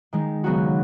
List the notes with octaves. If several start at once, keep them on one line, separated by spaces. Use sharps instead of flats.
D#3 G#3 D#4
C#3 F#3 B3 D#4 F#4